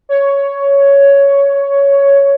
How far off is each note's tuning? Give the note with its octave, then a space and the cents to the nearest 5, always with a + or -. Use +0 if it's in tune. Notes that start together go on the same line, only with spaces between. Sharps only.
C#5 +10